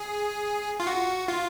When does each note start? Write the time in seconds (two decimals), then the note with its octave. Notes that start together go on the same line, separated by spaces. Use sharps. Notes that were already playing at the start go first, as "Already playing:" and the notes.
Already playing: G#4
0.80 F4
0.87 F#4
1.28 F4